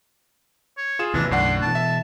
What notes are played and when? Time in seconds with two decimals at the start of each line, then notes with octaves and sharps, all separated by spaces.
0.77 C#5
0.99 F4 G#4 E7
1.14 A1 D#2 C3 E3 D4
1.31 B1 F#2 A2 D3 D4 F#5 C6
1.62 B2 E3 A5
1.75 E5